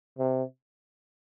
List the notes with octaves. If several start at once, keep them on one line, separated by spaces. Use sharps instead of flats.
C3